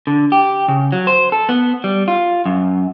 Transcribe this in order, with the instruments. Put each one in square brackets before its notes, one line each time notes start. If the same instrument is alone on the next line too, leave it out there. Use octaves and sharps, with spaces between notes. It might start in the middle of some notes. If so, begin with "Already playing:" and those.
[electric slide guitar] D3
G4
C#3
F#3
C5
A4
B3
G3
F4
F#2